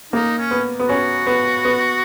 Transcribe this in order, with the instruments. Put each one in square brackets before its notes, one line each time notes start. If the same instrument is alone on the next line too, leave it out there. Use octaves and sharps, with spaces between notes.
[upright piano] A#3 [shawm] D#4
[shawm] C#4
[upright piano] B3
B3
[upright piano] C#4 [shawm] F#4
[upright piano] B3
B3